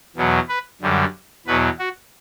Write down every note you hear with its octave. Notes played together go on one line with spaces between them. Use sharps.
E2 B2 F#3
B4
F#2 D3 G3
E2 B2 F#3 B4
F#4